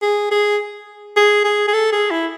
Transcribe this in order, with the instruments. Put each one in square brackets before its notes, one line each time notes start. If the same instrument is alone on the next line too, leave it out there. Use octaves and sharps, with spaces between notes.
[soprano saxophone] G#4
G#4
G#4
G#4
G#4
A4
G#4
E4